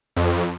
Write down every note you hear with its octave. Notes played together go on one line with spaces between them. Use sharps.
F2